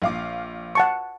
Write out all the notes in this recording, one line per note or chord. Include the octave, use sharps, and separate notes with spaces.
A#1 F5 D6
F#5 A5 C#6